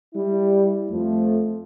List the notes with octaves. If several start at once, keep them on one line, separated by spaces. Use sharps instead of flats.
G3 E4
F2 F3 A3